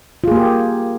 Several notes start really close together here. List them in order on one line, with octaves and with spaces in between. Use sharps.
F4 G#4 A#3 G4